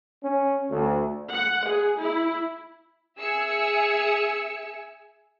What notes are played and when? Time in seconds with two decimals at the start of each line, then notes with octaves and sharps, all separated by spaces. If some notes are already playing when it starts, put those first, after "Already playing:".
0.24 C#4
0.70 D2
1.30 F#5
1.66 G#4
2.00 E4
3.18 G#4 E5 G#5 E6 C#7